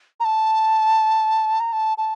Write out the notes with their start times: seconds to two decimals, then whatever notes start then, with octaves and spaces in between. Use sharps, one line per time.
0.20 A#5
0.25 A5
1.60 A#5
1.73 A5
1.98 A5